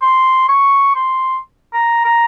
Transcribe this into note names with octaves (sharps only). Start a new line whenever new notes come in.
C6
C#6
C6
A#5
A#5